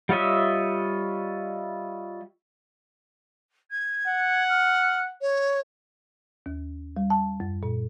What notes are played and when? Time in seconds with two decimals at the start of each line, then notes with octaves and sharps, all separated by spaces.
0.09 G3 F4 C#5 D#5 E5
3.70 G#6
4.07 F#5
4.49 F6
5.21 C#5
6.46 D#2
6.97 G3
7.10 A5
7.40 F#2
7.63 A#2